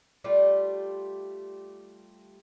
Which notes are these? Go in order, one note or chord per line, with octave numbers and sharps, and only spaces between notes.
G3 A3 F4 G4